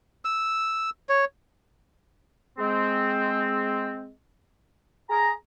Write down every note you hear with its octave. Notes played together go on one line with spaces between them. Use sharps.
E6
C#5
G#3 C4
G#4 A#5